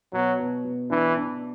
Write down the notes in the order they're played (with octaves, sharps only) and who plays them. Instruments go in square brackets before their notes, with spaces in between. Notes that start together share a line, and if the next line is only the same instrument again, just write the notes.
[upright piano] B2 [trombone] F#3
[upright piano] B2
B2
[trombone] E3 [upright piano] D4
[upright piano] D4